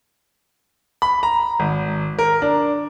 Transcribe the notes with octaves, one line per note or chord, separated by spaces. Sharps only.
B5
A#5
G#1
A#4
D4